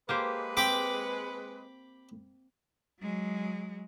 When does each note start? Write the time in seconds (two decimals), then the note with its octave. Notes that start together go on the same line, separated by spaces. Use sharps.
0.09 G#3 A#3 G4 B4 C5
0.57 C4 G5 B5 D6
3.01 F#3 G#3